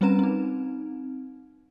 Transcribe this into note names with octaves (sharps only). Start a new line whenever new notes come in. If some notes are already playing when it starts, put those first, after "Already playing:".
G3 C4 C#4 B4 A#5 E7
C4 D#4